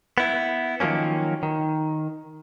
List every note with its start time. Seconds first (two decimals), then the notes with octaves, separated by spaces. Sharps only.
0.18 B3 E4
0.80 D#3 F3 F#3 A#3 C#4
1.43 D#3